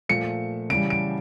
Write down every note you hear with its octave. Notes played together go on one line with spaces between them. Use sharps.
A#2 F3 A3 C#7
C#3 E3 G3 D7
D7